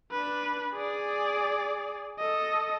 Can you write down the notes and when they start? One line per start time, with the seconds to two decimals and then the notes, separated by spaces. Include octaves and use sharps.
0.12 D4 B4
0.74 G#4 D5
2.19 A4 D#5